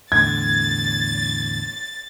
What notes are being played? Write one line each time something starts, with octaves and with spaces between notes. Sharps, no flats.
E2 A2 D3 G#6 A6